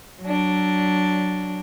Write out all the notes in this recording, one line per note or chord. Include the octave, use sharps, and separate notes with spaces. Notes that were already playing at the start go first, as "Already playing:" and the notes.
F#3 D4